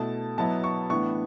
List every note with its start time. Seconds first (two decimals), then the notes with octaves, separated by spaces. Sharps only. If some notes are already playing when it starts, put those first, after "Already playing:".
Already playing: B2 A3 E4 A5
0.38 B2 F#3 B3 E4 A5
0.64 C#6
0.89 A2 E3 B3 D4 C#6